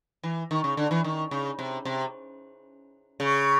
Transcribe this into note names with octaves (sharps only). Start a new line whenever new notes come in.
E3
D#3
C#3
D3
E3
D#3
C#3
C3
C3
C#3